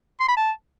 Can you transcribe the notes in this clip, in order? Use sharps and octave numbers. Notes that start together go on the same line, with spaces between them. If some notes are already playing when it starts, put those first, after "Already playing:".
C6
B5
A5